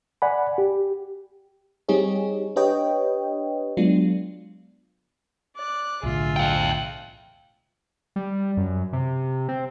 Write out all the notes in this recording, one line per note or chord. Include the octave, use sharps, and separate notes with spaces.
D5 F#5 G#5 B5
G4
G3 C4 D#4 G4 G#4 C#5
D4 G4 B4 C#5 D#5 G5
F#3 G#3 B3 D4 F4
D5 F#6
B1 A2 D3 F4 G#4 E5
F5 G5
G3
F#2
C3
C4